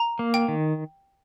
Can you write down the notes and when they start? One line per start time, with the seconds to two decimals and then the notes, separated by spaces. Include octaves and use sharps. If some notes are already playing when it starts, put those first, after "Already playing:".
Already playing: A#5
0.19 A#3
0.34 G5
0.48 D#3